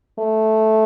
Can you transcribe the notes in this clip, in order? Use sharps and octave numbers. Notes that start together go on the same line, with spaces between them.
A3